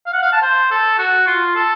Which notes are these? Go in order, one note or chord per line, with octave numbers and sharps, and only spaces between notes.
F5
F#5
F5
A5
C5
A4
F#4
F4
A4